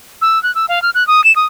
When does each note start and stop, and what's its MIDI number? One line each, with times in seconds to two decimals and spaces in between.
0.21 0.41 88
0.43 0.54 90
0.55 0.66 88
0.68 0.82 77
0.82 0.90 89
0.94 1.06 90
1.07 1.24 87
1.24 1.34 100
1.36 1.46 87